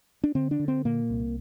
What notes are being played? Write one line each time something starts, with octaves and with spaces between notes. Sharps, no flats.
D4
D3 C4
D4
D3
C4
A#2 A#3
C2